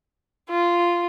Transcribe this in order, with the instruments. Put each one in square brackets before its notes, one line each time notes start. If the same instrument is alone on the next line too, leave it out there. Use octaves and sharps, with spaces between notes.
[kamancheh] F4